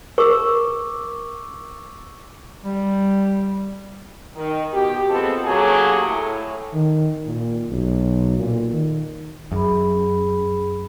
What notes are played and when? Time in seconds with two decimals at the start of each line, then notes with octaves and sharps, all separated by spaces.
0.18 A#4 C#6 D6 E6
2.63 G3
4.36 D#3
4.73 B2 G4
5.09 G#3 B3 C4 F4 A4
5.45 F#2 F#3 A3 A#3 G4 G#4
6.05 A2
6.73 D#3
7.26 A#2
7.70 B1
8.38 A#2
8.72 D#3
9.51 F#2 G#4 B5